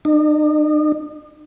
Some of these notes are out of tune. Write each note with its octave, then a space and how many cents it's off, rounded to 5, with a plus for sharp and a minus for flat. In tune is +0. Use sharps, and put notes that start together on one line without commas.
D#4 -45